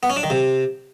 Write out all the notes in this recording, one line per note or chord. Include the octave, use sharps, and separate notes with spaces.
B3
C#4
D4
D#3
C3